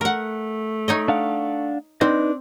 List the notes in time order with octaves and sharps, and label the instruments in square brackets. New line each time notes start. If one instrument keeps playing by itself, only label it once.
[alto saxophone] A3 [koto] A#4 F#5
[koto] D#4 C#5 D#5
[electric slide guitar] D4 F5 F#5
[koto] C4 [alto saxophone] D4 [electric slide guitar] D#4 B4 D#5